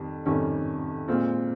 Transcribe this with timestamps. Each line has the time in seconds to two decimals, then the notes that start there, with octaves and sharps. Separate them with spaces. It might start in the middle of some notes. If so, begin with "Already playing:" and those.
Already playing: F2 D#3 G3
0.25 F2 C3 D#3 G3 C#4
1.08 A#2 G#3 C4 F4